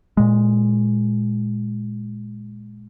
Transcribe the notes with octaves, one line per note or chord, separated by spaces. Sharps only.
A#2 G#3